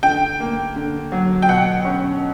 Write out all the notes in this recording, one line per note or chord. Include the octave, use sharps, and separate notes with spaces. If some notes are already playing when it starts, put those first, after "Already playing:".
D3 G5
A#3
D3
F#3
G5
B2 F#5
C#4